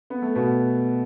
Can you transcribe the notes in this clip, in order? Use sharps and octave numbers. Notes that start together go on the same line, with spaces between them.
B3
A3
B2 B3